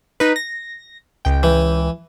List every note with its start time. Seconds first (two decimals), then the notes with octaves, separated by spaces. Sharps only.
0.20 D#4 B4
0.36 A#6
1.25 C#2 G5
1.43 E3